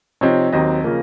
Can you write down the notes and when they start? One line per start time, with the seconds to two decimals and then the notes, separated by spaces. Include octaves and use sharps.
0.21 C3 F3 C4 D#4 C#5
0.52 D#2 D#3 F#3 C4 D#5
0.84 C#3 F3 A#3